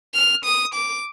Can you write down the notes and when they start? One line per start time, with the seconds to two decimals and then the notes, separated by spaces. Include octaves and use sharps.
0.14 F6
0.45 D#6
0.74 D6